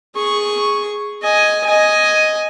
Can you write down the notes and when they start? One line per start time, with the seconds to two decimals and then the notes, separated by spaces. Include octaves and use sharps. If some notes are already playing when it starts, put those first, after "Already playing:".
0.15 G#4 C#6
1.22 D#5 G#5
1.66 D#5 G#5